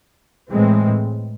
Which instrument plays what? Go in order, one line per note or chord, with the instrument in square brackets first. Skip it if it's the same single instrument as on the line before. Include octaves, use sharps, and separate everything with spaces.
[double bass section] A2 E3 G#3 C4